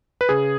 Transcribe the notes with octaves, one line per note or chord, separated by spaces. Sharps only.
B4
C#3 G#4